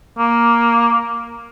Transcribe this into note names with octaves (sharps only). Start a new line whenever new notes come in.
A#3